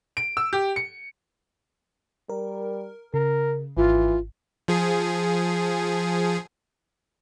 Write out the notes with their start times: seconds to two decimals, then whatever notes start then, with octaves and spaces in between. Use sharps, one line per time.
0.17 D7
0.37 E6
0.53 G4
0.76 C#7
2.29 G3 A#4
3.14 C#3 A#4
3.77 G#1 E3 F4
4.68 F3 G#4